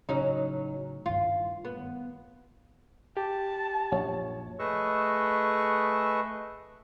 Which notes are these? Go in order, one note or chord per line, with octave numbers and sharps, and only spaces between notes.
A1 C#3 F#3 C#4 D#4
G2 D#3 F4
B3
G4 A5
A#1 F#2 C#5
A3 G#4 B4 D#5 C#6 E6